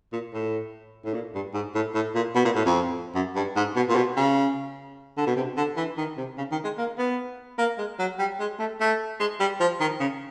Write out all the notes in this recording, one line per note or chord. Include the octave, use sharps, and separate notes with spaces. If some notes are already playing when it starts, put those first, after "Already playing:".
A#2
A2
A2
A#2
G2
G#2
A2
A2
A#2
B2
A#2
A2
F2
F#2
G2
G#2
B2
A#2
B2
C#3
D3
B2
C3
D3
E3
D#3
C3
C#3
D#3
G#3
A#3
B3
A#3
G#3
F#3
G3
G#3
A3
A3
G#3
G3
F3
D#3
C#3